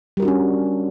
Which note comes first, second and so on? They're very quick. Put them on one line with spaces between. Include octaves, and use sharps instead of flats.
G3 A#4 F#4 D4 C#4